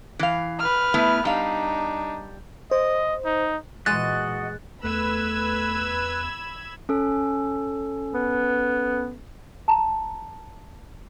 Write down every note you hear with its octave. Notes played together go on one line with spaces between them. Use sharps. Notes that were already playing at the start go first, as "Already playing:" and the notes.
E3 F5
B4 F6
A3 B3 E4
G3 D4 D#4 F5
C5 D#5
D#4
A#2 E3 G#3 F#4 D#5 F#6 A6
E2 A3 B4 B5 E6 G#6
C#4 A4
B3
A5 A#5